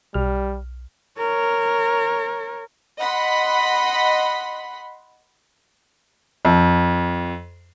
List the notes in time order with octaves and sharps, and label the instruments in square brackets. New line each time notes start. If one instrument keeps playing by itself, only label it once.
[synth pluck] B1 F6 [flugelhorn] G3
[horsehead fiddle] A#4 C#5
[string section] D#5 F#5 B5 C6 B6
[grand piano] F2